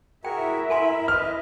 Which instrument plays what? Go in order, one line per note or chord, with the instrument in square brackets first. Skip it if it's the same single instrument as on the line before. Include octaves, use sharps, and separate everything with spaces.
[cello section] E4 E5 [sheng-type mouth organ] F#4 G#4 A#4 [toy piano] G5
[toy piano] A4 G#5 C6 [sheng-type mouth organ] A#4 B5
[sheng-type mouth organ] B4 D#5 [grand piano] F6